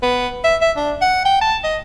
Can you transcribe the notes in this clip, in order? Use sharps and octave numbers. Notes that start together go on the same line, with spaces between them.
B3
E5
E5
D4
F#5
G5
A5
D#5